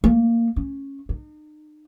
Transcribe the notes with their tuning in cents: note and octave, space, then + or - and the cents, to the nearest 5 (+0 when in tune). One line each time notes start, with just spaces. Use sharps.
A#3 -10
C#4 -10
D#4 -40